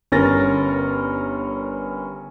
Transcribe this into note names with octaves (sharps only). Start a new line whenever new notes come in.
G1 C#4 A#4 A6 A#6